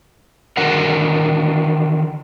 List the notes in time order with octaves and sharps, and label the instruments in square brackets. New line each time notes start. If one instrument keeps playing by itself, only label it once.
[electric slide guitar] D3 D#3 F#4 A#4 F#5